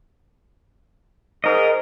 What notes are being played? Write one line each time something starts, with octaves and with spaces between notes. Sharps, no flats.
G#2 A#4 D#5